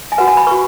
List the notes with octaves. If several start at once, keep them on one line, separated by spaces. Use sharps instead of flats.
G#5
F#4 B4 F#5
G#5
B5
F#4 B4 C#6